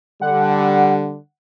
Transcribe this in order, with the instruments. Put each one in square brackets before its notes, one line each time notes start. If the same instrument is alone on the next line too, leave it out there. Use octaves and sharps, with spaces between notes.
[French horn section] D3 G3 [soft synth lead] F#5